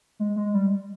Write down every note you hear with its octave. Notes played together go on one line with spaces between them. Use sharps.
G#3
G#3
G3